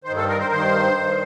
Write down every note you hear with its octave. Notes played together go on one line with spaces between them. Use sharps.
G2 D#3 C5
A4
A#4
C5
A#4
G2 D#3 C5
G2 D#3